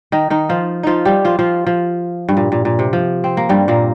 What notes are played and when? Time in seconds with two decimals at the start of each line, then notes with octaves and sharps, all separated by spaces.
0.12 D#3 D#4
0.30 D#3 D#4
0.49 F3 F4
0.83 F3 D#4 F4
1.05 G3 G4
1.25 F3 F4
1.39 F3 F4
1.67 F3
2.29 G2
2.37 A#2
2.52 A#2
2.65 A#2
2.79 C3
2.93 F3
3.24 C4
3.37 A#3
3.49 G2 G3
3.68 A#2 A#3